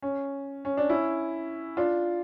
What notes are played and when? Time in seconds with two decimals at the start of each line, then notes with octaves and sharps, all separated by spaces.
0.02 C#4
0.65 C#4
0.77 D4
0.90 C#4 E4
1.77 D4 F4